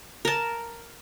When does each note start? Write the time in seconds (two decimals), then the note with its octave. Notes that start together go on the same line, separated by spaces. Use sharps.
0.25 A#4 A5